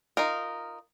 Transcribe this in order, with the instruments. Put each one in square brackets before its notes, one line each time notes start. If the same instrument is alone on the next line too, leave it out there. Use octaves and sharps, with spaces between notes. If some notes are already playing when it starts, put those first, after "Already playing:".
[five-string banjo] D#4 F4 A#4